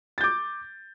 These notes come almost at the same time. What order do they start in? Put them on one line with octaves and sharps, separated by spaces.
A6 G6 D6